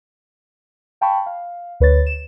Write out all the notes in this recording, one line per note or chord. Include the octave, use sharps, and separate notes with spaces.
F5 G5 A5 B5 C#6
F5
D2 B4 C#5 A6
E7